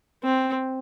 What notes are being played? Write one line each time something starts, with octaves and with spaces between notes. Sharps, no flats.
C4